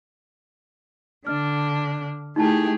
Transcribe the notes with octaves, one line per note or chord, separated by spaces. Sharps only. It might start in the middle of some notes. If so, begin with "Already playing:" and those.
D3 D4 F6
A3 D#4 E4 G4 G#4 A5